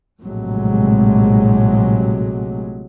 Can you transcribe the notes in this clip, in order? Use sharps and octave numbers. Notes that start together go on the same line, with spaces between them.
A#1 A2 C3 F#3 G#3